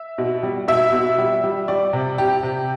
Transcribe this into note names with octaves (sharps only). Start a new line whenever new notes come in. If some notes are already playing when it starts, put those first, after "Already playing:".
Already playing: E5
B2
G3
B2 E5
B2
G3
G3
G3 D5
C3
C3 G4
C3